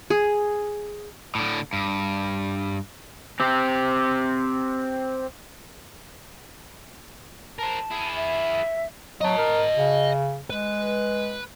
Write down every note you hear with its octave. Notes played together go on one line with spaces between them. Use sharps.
G#4
A2 D3
G2
C4 G4
A#4 C5 A5
E4 G#4
E5
F#3 D#5 A5
A#4
C#3
G#3 B4